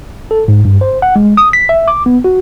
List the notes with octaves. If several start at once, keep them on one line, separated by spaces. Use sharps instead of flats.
A4
G#2
G2
C5
F#5
G#3
D#6
B6
E5
D6
B3
F#4